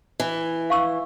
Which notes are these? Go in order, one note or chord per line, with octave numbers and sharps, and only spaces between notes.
E3
F5 C#6 E6